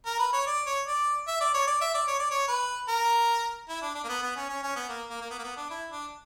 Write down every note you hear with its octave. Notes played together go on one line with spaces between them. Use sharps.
A#4
B4
C#5
D5
C#5
D5
E5
D5
C#5
D5
E5
D5
C#5
D5
C#5
B4
A#4
E4
D4
D4
A#3
B3
B3
C#4
C#4
C#4
B3
A#3
A#3
A#3
B3
A#3
B3
D4
E4
D4